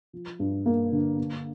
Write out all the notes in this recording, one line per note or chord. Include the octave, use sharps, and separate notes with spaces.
F3
G2
A#3
D3
A#3